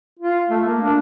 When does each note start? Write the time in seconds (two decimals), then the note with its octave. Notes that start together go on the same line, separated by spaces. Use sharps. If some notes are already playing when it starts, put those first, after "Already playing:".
0.19 F4
0.49 A3
0.65 A#3
0.82 D4